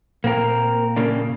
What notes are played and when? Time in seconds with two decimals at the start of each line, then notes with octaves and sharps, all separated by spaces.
0.24 A#2 A#3 C4 A#4
0.96 C#3 A#3 D4